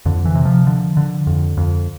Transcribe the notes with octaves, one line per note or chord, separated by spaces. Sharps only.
F2 D3
E3
C3
F3
D3
D3
F2
F2